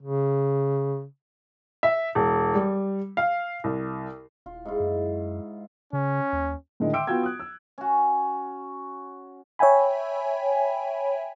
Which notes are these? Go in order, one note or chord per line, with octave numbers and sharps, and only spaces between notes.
C#3
E5
E1
G3
F5
C2
D#1 F4
G#2 E4 F4
F#2
C#3 C#4
D#2
A2 D3 D#3 G#3
E5 G5 C6 D6 E6 D7
B3 F4 F#4 G5 E6 G#6
D#6 F#6
E6
C#4 F#4
C#5 E5 G5 G#5 B5